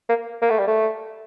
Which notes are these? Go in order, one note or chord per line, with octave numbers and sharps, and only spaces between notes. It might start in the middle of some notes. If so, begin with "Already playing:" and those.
A#3
A#3
A3
G3
A3